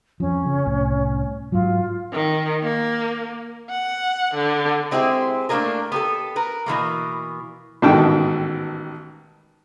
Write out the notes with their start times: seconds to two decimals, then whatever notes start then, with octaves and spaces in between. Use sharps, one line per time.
0.20 F2 F3 C#4
0.46 C#3
0.66 C2 A2
1.52 G#2 F#3 F4
2.13 D#3
2.62 A#3
3.70 F#5
4.34 D3
4.91 G#3 C4 E4 G4 G#4
5.49 A3 A#3 D4 E4 G#4 A#4
5.92 B3 G4 A4
6.36 A#4 B4
6.66 B2 E3 A3 A#3
7.82 A1 G#2 B2 D#3 A4 G5